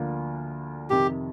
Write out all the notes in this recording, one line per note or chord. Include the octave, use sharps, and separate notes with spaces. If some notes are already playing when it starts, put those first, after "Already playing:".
Already playing: D2 D3 F3 A#3
F2 C3 D#3 G4